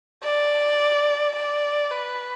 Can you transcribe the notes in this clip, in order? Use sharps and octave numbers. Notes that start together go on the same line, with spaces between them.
D5
D5
B4